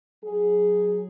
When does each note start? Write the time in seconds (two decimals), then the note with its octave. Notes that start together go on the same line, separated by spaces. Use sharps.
0.23 F#3 G#4